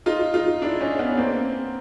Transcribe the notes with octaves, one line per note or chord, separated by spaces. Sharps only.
D#4 F4
D#4 F4
D4 E4
C#4 D#4
B3 C#4
A#3 C4